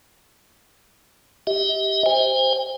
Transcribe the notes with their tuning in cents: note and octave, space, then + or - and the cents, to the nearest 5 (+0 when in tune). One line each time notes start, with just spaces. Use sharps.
G4 +0 D#5 +45
C5 +0 G#5 -45